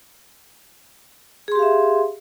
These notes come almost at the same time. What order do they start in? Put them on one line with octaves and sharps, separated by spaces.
G#4 C6 G4 F5 E5